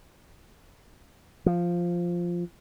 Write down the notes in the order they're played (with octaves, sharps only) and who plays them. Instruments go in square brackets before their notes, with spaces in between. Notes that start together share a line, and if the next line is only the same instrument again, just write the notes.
[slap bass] F3